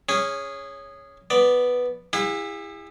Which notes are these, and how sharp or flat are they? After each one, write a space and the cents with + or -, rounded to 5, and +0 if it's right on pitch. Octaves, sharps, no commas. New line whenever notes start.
C#4 +0 G#4 -15
B3 +0 D5 +0
E4 +0 G#4 -45 F5 +40